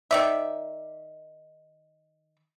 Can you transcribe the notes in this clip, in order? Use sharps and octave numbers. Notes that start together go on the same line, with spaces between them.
D#3 D5 E5